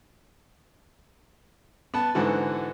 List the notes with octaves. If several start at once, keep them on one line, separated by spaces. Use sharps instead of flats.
B3 B4 A5
G#2 D3 E3 F#4